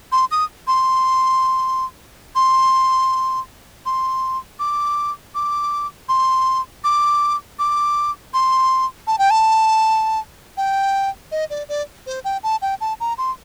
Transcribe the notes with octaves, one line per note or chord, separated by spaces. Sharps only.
C6
D#6
C6
C6
C6
D6
D6
C6
D6
D6
C6
A5
G5
A5
G5
D#5
D5
D5
C5
G5
A5
G5
A5
A#5
C6